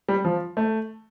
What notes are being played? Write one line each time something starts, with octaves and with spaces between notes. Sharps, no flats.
G3
F3
A3